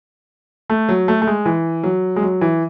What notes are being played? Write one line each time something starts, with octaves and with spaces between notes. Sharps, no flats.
A3
F#3
A3
A3
G#3
E3
F#3
G#3
F#3
E3